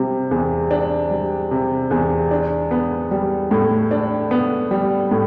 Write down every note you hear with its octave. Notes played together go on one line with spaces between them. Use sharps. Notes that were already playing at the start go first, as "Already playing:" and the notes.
Already playing: C3 G3
E2
D4
G3
C3
E2
D4
B3
G3
A2
D4
B3
G3
A2